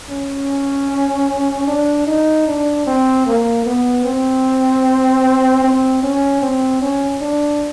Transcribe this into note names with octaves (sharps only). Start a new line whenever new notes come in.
C#4
D4
D#4
D4
C4
A#3
B3
C4
C4
C#4
C4
C#4
D4